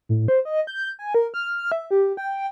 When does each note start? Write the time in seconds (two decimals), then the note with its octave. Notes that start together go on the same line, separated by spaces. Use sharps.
0.09 A2
0.28 C5
0.45 D#5
0.67 G6
0.99 G#5
1.15 A#4
1.34 F6
1.72 E5
1.91 G4
2.17 G5